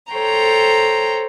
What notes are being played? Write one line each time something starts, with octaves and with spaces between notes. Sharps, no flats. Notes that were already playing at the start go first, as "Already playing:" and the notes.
A4 C5 C#5 G5 A#5